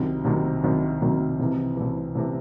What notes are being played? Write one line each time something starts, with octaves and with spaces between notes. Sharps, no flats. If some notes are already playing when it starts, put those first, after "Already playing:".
Already playing: C2 C3 D#3 F#3
C2 C3 D#3 F#3
C2 C3 D#3 F#3
C2 C3 D#3 F#3
C2 C3 E3
C2 C3 E3
C2 C3 E3